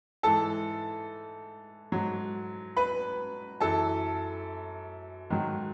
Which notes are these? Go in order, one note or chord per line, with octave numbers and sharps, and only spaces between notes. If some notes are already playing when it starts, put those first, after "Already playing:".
G#2 E3 A4 A5
G#2 F#3
B4 B5
F#2 E3 A4 A5
G#2 D#3 F#3